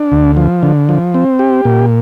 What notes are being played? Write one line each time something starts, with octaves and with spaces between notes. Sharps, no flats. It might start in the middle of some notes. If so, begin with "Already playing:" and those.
Already playing: D4
D2
F3
D3
F3
C4
G4
A#2